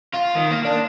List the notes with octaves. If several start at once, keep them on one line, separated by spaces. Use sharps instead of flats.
F4
D#3
A#3
D4